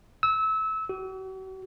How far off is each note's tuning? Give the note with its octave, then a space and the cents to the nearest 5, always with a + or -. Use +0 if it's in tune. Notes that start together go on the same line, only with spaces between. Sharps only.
E6 -25
F#4 +40